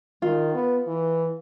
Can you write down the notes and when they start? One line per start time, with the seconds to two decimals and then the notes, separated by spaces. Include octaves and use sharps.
0.22 D#3 F4
0.54 B3
0.87 E3